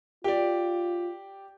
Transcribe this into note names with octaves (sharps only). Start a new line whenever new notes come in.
F4 G4 D5